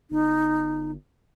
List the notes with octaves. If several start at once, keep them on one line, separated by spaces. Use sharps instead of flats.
G1 D#4